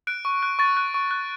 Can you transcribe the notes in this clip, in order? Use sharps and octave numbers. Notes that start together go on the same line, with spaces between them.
F#6 D7
C#6
F#6
C#6 A6
F#6
C#6
F#6